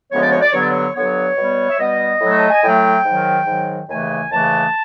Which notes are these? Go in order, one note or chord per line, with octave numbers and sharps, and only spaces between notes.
D2 C#3 F3 G#3 B3 C#5
D5
C#5
D5
G2 D3 F#3 B3 C#5
D5
C#5
G2 D3 F#3 B3 C#5
B2 G3 B3
E5
B2 G3 B3 D#5
A2 F#3 A3
A5
G#5
A2 F#3 A3 G5
G#2 D#3 F#3
G#2 D#3 F#3
D#2 C#3 E3 A3 G#5
D#2 C#3 E3 A3 A5